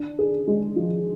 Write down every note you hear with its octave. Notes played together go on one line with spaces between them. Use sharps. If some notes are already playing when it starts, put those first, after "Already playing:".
Already playing: D4
G#4
G#3
F3